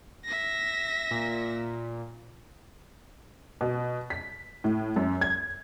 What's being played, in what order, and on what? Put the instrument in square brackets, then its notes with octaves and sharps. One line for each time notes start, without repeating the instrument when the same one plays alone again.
[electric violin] E5 A#6
[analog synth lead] A#2
[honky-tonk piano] B2
B6
A2
F#2
G#6